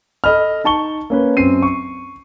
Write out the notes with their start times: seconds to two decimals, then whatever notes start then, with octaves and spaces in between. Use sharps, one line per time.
0.24 A4 D#5 B5 F6
0.64 D#4 A5 C#6 G7
1.10 A#3 C#4 B4
1.37 F#2 C4 C7 D#7
1.62 C#6